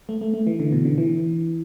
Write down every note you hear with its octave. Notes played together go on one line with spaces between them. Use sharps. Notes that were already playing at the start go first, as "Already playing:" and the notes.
A3
A3
A3
E3
D3
B2
D3
E3